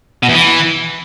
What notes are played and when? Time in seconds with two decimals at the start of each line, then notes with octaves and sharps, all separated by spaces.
0.23 B2
0.28 E2
0.34 E3